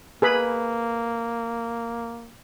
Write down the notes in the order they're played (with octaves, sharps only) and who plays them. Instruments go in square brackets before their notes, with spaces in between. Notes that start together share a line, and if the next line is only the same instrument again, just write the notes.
[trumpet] A#3 [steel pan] G#4 B4 B5